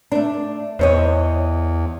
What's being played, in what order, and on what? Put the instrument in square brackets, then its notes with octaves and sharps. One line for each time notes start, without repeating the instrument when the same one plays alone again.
[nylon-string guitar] A3 D4
[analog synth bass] E2 [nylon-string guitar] C5 C#5 D#5